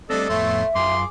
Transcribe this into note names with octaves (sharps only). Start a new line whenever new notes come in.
G3 A3 C4 D4 A4 D5 D#5
F2 A2 A3 B3 C#5 E5 C6
F#2 F4 G#4 C6 D6